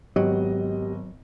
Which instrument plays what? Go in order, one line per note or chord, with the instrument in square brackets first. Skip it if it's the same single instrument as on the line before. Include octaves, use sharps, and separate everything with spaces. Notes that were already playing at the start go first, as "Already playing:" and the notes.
[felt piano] G#1 B3 D#5 [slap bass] F#3 [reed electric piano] G4